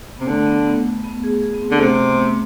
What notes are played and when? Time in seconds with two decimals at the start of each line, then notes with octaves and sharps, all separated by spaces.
0.17 C3 B3
0.27 D3 A3
0.47 B3
0.66 B3
1.04 B3
1.24 G#4
1.42 G#4
1.54 B3
1.62 C4
1.71 D3
1.76 A3
1.80 C3 B3
1.99 A3
2.19 A3